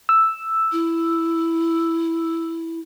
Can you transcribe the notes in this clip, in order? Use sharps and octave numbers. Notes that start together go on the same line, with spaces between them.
E6
E4